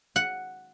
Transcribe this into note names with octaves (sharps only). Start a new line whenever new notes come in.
F#5